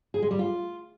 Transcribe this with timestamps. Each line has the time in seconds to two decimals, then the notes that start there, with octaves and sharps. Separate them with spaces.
0.14 G#4
0.22 G#3
0.31 G3
0.39 F4